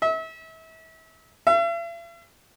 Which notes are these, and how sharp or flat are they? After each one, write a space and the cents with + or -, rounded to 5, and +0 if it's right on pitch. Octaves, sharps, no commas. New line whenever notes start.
E5 -35
E5 +45